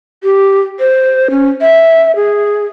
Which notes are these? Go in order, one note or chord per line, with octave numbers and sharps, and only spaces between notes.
G4
C5
C#4
E5
G#4